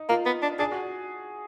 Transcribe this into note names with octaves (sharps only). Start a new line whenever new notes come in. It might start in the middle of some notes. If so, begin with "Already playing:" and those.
Already playing: D#4
A#3 F4
B3
D4
D4 G#4
F#4